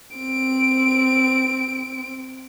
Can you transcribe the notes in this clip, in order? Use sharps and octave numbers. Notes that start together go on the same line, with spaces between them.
C4 D7